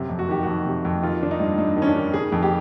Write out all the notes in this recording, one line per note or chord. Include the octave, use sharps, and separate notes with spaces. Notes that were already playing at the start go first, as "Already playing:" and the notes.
Already playing: F#2 C3
F2
F#4
D#3 G4
F2 F#4
C3
F2
D#3 F4
D#3 D4
D#4
G2
G2 D#4
D#3
C#4
D4
D#3
C#3 G#4
F2
G4